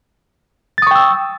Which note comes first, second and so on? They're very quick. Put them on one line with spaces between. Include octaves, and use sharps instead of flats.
A6 D#6 C#6 G5 E6